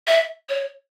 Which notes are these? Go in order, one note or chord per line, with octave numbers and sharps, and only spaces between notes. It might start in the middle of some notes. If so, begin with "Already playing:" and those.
E5
C#5